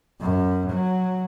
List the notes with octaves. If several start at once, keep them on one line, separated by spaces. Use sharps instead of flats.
F#2
F#3